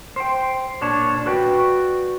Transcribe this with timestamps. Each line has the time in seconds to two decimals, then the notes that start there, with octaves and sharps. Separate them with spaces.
0.16 C5 G5
0.81 A#2 D4 C#5 A5
1.26 F#4 B4 D5 G5